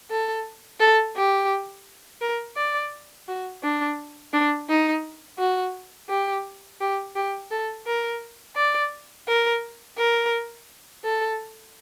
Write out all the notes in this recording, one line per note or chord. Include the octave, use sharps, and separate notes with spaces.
A4
A4
G4
A#4
D5
F#4
D4
D4
D#4
F#4
G4
G4
G4
A4
A#4
D5
A#4
A#4
A4